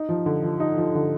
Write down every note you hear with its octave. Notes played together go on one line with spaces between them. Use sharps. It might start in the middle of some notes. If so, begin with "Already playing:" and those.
Already playing: D#4
F3
D3
F3
D#4
F3
D3